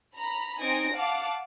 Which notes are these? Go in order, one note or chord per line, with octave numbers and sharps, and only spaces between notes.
A#5 B5
C4 D#4 G#5 A#6 D7
F5 F#5 A5 D6